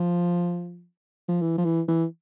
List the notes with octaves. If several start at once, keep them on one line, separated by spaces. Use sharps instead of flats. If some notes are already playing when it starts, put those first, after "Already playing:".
Already playing: F3
F3
E3
F3
E3
E3